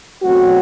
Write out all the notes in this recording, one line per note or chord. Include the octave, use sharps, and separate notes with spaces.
E2 B2 F#3 A3 C4 F#4